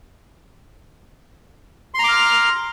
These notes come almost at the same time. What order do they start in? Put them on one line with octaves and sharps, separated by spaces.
C6 A#5 D6 F6